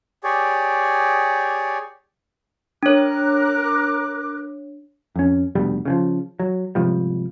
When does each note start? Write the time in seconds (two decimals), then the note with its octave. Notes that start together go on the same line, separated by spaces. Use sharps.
0.24 G4 G#4 C#5 D5
2.83 D4 A#4 C#5 D6 F#6
5.16 F2 C#4
5.55 F1 G2 B2 G3
5.85 C#3 E3 F3
6.40 F#3
6.75 G#2 C3 F3 G3